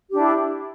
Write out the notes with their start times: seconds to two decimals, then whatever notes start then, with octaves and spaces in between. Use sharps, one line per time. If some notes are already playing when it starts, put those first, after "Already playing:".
0.09 G4
0.12 D4
0.15 E4